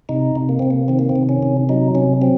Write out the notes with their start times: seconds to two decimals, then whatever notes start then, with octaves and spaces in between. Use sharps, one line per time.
0.09 C3 D#4
0.36 C3
0.49 A#3
0.59 C3 C4
0.71 A#3
0.88 D#3 C4
0.99 A#3
1.09 C4
1.16 C3
1.29 C#4
1.43 C3
1.69 F#3 D#4
1.95 C3 C#4
2.22 F#3 C4